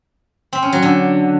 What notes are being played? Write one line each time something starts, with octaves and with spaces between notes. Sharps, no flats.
C4
C#4
F#3
D3